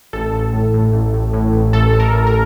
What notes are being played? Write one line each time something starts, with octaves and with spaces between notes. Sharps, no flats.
A1 A4
A1
A2
A2
A1
A2
A2
A1
A1 A4
A1
A#4
A1
A#4